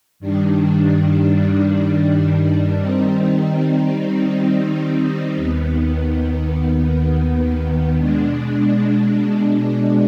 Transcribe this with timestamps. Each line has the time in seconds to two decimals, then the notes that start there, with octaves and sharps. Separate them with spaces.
0.20 G2 D#3 G3 D4
2.78 D#3 G3 C4 D#4
5.35 D#2 D#3 B3
7.93 B2 G#3 D4